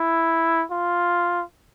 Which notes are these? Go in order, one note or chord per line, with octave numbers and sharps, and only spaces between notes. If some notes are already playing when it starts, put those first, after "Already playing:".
Already playing: E4
F4